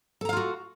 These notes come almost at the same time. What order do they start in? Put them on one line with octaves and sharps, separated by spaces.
A4 A#5 F5 F4 F#4